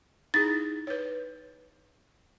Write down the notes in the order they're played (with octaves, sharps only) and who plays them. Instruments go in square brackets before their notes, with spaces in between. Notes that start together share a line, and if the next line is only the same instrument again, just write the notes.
[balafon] D#4 E4 G#4 [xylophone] A6
[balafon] B4 C#5